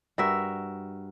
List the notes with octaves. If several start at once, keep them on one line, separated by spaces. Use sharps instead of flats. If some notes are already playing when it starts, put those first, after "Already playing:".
G2 F#4 A#4 E5